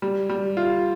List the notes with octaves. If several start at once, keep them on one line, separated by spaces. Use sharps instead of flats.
G3
G3
F4